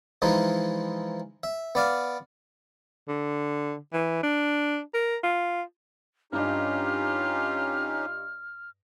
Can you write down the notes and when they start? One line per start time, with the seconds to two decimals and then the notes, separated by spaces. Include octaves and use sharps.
0.22 E3 F3 G#3 D#4
1.43 E5
1.75 B3 D5 F5
3.08 D3
3.93 E3
4.23 D4
4.94 A#4
5.24 F4
6.33 G2 C#4 D#4 F4 G4 D#5 F6